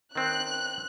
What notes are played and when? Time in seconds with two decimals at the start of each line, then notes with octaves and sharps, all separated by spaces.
0.15 D#3 C4 F#6